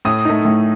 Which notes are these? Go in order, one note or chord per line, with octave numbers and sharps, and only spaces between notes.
A2 D#6
A3 D#4
A2